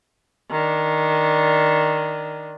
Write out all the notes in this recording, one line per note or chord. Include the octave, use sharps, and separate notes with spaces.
D#3 D4